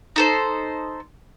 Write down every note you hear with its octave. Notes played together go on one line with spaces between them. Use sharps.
D#4 A4 C5